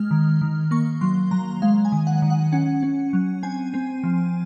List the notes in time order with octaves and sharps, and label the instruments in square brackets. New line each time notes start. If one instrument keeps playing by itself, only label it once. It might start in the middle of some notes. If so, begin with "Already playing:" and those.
Already playing: [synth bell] G#3 F6
D#3
D#3
A#3 C#6
F#3 C6
F#3 A#5
G#3 F5
G#5
D#3
F#5
D#3
F#5
C#4 F#5
C#4
F#3
C4 G#5
C4
F3